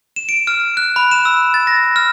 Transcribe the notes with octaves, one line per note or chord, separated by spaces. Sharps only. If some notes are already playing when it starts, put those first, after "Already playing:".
E7
D7
F6
F#6
B5
E7
E6
A6
A#6
F6